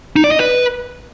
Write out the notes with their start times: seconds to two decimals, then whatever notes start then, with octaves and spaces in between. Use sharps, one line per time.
0.16 D#4
0.24 D5
0.32 D#5
0.39 B4